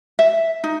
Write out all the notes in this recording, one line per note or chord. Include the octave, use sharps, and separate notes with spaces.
E5
D#4